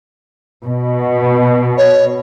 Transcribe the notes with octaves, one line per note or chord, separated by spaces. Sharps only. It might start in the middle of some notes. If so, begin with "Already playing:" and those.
B2
C#5